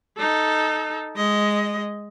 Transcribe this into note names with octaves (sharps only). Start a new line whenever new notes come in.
D#4 A4
G#3 D#5